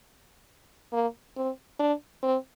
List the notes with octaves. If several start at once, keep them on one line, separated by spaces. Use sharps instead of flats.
A#3
C4
D4
C4